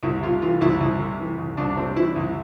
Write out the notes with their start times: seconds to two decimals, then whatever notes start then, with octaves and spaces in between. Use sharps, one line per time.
0.03 C2 E4
0.23 C3 F4
0.42 E3 F4
0.61 C2 E4
0.80 C2
1.00 C3
1.19 E3
1.38 C2
1.57 C2 D4
1.70 D4
1.77 C3 C4
1.96 E3 E4
2.16 C2